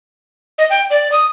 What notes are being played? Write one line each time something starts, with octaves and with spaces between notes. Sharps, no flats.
D#5
G5
D5
D#6